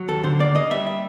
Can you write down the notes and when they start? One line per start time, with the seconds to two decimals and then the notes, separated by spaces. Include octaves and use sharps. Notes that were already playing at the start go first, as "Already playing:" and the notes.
Already playing: F#3
0.08 D#2 A4
0.23 D3 C5
0.39 A#3 D5
0.55 A#3 D#5
0.71 G3 E5
0.87 E5